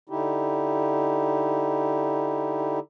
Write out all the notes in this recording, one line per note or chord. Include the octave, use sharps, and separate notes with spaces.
D3 D#4 E4 G4